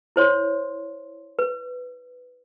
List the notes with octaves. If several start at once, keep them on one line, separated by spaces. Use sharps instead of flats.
E4 C5 C#5 C6
B4